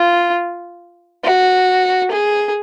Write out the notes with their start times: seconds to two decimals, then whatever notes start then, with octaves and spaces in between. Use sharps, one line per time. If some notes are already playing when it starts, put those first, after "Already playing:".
Already playing: F4
1.24 F#4
2.11 G#4